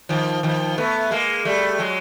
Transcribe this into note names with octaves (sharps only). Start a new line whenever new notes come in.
D#3 F3
D#3 F3
A3 B3
G#3 A#3
G3 A3
F#3 G#3